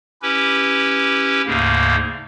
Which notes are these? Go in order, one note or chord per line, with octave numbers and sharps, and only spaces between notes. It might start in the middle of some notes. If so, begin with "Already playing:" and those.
C#4 E4 G4 B4
D2 G#2 C#3 A#3